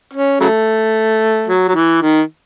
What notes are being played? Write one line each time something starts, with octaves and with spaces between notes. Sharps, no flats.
C#4
C#3 F#3 A3
F#3
F#3
E3
D#3